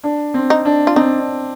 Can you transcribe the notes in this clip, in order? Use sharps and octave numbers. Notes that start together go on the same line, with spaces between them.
D4
C4
D#4
D4
F4
C4 D#4
D4